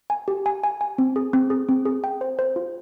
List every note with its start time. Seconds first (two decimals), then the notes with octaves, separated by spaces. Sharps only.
0.10 G#5
0.28 G4
0.46 G#5
0.63 G#5
0.81 G#5
0.98 C4
1.16 G#4
1.33 C4
1.50 G#4
1.69 C4
1.85 G#4
2.04 G5
2.21 C5
2.39 C5
2.56 F4